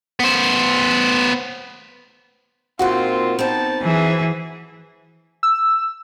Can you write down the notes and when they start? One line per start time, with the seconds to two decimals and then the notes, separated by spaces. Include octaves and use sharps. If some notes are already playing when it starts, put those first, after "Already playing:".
0.19 B3 C5
2.79 A#2 A#3 C4 D#4 F4 F#4
3.39 B3 C4 D#4 A5
3.83 E3 G#4 E5
5.43 E6